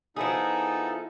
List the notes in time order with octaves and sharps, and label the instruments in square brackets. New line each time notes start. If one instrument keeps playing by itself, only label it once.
[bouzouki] F3 E4 G#4 [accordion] B3 D#4 A4